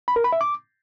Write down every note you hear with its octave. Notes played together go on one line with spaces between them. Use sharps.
B5
A#4
B5
E5
D6